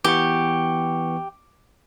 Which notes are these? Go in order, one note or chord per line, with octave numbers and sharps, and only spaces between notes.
E3 B3 G4 C#6